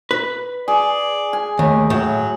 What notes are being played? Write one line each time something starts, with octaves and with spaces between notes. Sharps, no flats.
B4
G#4 D5
G#5
D#2 A3 C#5
A2 F#3